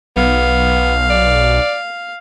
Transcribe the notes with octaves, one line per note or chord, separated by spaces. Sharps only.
B1 B3 F5
D5